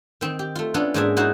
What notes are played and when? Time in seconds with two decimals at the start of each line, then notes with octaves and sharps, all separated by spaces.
0.21 D#3 C4
0.39 G4
0.56 A3 F4
0.74 B3 C#4 D4 F4 A4
0.94 G#2 A#3 C#4 D4 G#4 E5
1.17 D#4 E4 F#4 C5 C#5